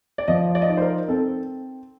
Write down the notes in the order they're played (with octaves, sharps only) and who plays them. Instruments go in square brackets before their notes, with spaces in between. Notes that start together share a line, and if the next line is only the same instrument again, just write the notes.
[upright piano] D5
[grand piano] F3 [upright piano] D#5
[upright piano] D5
D#5
[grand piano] D#4 [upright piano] D5
[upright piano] C5
A#4
[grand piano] C4 [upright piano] A4